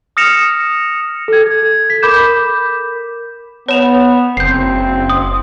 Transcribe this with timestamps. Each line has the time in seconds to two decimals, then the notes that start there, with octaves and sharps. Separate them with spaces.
0.17 D#6 F6 A#6 C#7 E7 F7
1.28 A4 G#6
1.90 B6
2.02 A#4 B5 D6 G6 E7
3.68 B3 C#5 E7 F7
4.37 F#1 C4 G6 C7
5.10 D#6